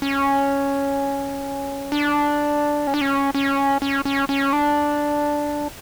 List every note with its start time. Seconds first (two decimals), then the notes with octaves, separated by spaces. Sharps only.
0.02 C#4
1.92 D4
2.87 C#4
2.94 D4
3.01 C#4
3.35 C#4
3.82 C#4
4.05 C#4
4.29 C#4
4.53 D4